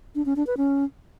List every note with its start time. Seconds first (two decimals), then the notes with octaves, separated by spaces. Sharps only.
0.15 D4
0.26 C#4
0.36 D4
0.47 B4
0.57 C#4